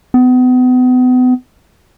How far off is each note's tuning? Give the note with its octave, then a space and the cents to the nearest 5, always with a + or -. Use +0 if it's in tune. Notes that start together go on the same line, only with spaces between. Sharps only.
B3 +35